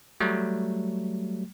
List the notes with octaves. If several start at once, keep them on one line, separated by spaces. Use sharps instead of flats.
F#3 G3 A3